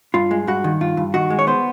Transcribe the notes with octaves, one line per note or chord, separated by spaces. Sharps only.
G2 F4
G#3
G2 F#4
D#3
G2 F4
G2
D#3 F#4
G#3
C#5
B3 C5